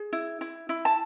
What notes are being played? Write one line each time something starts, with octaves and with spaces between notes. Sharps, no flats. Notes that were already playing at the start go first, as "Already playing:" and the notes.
Already playing: G#4
E4
E4
E4
A5